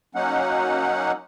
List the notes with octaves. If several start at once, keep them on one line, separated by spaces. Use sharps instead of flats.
F#3 A#3 C#4 D#4 F#5